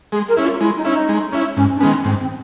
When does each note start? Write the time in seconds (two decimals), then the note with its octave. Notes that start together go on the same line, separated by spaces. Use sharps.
0.12 G#3 G#4
0.29 A#4
0.37 C#4 E4
0.45 F4
0.60 G#3 E4
0.77 D#4
0.85 C#4 E4
0.93 D#4
1.09 G#3
1.33 C#4 E4
1.56 G#2 C#4
1.76 D4
1.80 D#3 G#3 B3 C#4
2.04 G#2 C4
2.21 C4